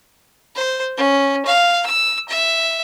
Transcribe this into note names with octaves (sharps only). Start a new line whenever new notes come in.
C5
C#4
F5
E6
E5